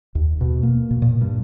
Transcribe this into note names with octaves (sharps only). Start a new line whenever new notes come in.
D#2
B2
A#3
B2
A#2
G2